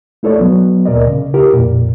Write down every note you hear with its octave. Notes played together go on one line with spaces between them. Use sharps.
A3 E4 A4 C#5 D5
F#3 B3
D2 A#2 A#4 D5 D#5
C#3
E4 G4 A#4
F2 A#2